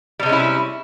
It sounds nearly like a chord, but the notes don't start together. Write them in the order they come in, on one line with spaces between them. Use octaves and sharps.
G3 C3 G#3 C#4 E4